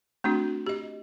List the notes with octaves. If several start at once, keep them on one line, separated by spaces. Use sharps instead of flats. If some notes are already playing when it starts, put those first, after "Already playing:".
A3 C4 D4 F#4
G4 D#5